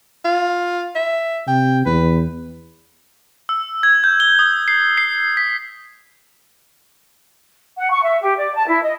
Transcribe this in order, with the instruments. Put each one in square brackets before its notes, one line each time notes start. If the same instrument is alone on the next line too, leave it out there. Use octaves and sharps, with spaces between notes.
[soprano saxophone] F4
E5
[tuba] C3 [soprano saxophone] G5
[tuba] E2 [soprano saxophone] B4
[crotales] E6
G#6
G6
G7
D#6
C7
C7
B6
[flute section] F#5
C#6
E5
G4
D5
A5
E4
D#5